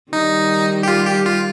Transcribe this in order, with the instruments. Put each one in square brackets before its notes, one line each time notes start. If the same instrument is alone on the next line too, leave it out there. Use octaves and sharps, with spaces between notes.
[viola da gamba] D#3 G3 [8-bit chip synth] D#4
[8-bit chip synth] G4
F4
G4
F4